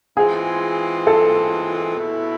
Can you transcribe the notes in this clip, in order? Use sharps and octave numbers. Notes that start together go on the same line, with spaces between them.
E3 G#3 C4 F4 G#4
A4
B2 A3 E4